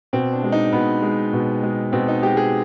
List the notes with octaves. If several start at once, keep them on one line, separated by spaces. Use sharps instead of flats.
B2 C4
D4
G#3
D#4
B2 B3
G#3
B2
G#3
B2 C4
D#4
G#3 G4
G#4